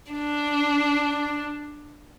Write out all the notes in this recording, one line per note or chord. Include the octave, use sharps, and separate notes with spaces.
D4